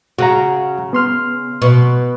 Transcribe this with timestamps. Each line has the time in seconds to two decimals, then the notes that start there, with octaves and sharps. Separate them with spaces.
0.18 C#3 F#4 F#5 A#5
0.93 B3 C6 F6
1.62 B2